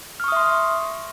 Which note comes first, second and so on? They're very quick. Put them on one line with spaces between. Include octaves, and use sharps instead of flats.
F6 C#6 D#6 E5 C6